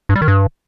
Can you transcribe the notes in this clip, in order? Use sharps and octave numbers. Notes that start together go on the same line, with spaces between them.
G2
G3
D#3
G2